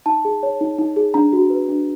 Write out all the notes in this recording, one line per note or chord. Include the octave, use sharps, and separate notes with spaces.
D#4 A5
G#4
C#5
D#4
D#4
G#4
D4 A#5
F#4
B4
D4